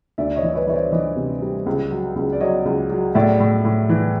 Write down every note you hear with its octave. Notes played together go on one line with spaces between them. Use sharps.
D2 D5 E5
C#5 D#5
E3
D5
B4 C#5
E3 C#5
C5 D5
E3 C#5 D#5
C3
G3
C#2
F#3
C#2
D5
F#3 C#5 D#5
C#2
F#3
A2 D5 E5
A2
A2
E3